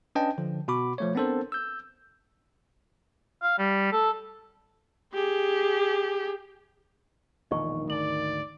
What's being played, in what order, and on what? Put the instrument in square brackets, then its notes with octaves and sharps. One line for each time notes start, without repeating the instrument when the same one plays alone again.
[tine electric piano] C#4 D4 B4 D#5 G5 A5
D3 F3
B2 F#4 B5 D6
F3 A3 C#5
B3 C4 D4 A4 A#4 C5
E6 G6
[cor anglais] F5
G3
A4
[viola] G4 G#4
[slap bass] E1 A#1 A#2 [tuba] D#3 [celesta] D#5 C#6
[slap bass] G#1 D2 [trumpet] D5 [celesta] F#7